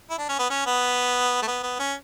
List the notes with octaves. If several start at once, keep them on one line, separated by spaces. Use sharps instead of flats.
E4
D4
C#4
B3
C#4
B3
A3
B3
B3
C#4